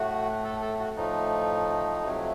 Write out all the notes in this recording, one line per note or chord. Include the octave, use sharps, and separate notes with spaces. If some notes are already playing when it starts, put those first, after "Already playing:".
Already playing: A2 A3 F#4
A4
A4
F#4
A2 F3 A3 D#4
F2 C3 F#3 A3